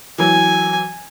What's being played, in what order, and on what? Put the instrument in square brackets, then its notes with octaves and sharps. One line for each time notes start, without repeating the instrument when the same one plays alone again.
[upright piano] E3 F#3 [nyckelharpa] G#5